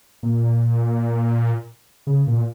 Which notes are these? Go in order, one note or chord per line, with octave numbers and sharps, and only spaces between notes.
A#2
C#3
A#2